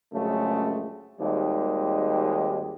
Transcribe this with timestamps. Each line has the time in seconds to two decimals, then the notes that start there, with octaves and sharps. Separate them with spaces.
0.13 A#1 F#2 C#3 G#3 A3
1.19 G#1 D#2 G3 G#3 D#4 G4